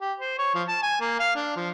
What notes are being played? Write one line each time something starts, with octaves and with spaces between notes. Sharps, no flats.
G4
C5
C#5
F3
A5
G#5
A#3
F5
D4
F3